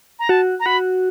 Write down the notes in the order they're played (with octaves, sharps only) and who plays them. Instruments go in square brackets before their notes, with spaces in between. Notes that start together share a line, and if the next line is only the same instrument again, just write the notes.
[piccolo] A#5
[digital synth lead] F#4 [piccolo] A5
[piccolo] A#5
[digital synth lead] F#4 [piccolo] B5